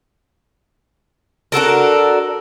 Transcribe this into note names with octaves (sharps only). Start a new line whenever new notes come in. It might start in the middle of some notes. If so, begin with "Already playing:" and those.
D4 F#4 A4 A#4